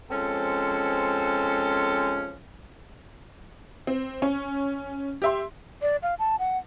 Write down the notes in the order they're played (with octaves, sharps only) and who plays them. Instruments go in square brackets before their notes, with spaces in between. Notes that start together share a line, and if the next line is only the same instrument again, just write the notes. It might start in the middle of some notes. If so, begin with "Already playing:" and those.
[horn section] F3 G#3 C4 C#4 A4
[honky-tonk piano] C4
C#4 C#6
G4 E5 C6
[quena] D5
F5
A5
F#5